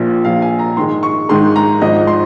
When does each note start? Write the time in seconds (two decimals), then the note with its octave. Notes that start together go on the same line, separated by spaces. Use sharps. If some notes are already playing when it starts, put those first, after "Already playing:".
Already playing: A#1 A#2 F3
0.24 A#1 A#2 F3 F5
0.42 G#5
0.59 A#5
0.77 G#2 D#3 G#3 C6
1.03 C#6
1.29 G#2 D#3 G#3 C6
1.56 A#5
1.81 G#1 G#2 F3 D#5
2.07 C6